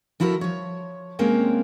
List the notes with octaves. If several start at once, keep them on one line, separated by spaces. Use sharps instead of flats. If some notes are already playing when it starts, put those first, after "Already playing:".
F3 E4 F#4 A4 A#4
F3 C#5
C3 G#3 A#3 C4 C#4 C#5